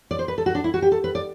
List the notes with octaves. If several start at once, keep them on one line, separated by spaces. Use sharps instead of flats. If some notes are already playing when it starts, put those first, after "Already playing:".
D5
C5
B4
A4
F#4
D4
E4
F#4
G4
A4
B4
D5